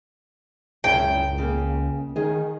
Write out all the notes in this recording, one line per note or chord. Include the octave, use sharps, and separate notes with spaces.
C#2 F#2 C#3 E4 G5
C#3 A#3
D#3 G#4 D#5